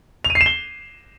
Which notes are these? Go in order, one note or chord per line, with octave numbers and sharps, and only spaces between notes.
F7
D#7
C7
E7
G7